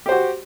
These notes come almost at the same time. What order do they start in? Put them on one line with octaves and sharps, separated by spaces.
G4 C5 F#4